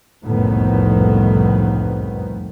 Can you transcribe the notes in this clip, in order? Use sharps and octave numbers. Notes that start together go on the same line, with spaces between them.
F#1 C2 F2 A2 D#3 B3